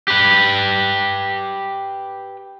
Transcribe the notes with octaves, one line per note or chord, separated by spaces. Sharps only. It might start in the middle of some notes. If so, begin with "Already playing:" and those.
G4 B4